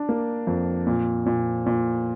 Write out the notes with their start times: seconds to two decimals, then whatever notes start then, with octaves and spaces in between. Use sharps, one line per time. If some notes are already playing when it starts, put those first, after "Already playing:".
Already playing: D4
0.09 A#3
0.47 F2
0.87 A#2
1.26 A#2
1.66 A#2